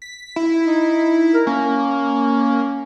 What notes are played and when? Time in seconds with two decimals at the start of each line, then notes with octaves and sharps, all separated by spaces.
0.02 B6
0.36 E4
0.65 D#4
1.34 A#4
1.47 A#3 C#4